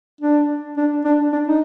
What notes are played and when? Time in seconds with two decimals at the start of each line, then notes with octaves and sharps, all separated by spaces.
0.21 D4
0.77 D4
1.05 D4
1.33 D4
1.48 D#4